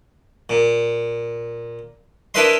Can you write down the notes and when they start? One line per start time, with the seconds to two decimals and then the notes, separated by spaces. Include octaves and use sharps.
0.50 A#2
2.34 D4 E4 A#4 B4 D#5 C6